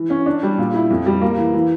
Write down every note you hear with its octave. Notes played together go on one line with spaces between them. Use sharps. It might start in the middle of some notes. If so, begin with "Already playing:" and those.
Already playing: E3
C#4
D4
G3
A#2
E4
F2
G3
A#3
E3
E3